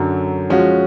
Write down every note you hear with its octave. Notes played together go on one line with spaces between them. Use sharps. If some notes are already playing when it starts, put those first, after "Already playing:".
Already playing: F#2 D3 F#3
F3 G#3 C#4 F#4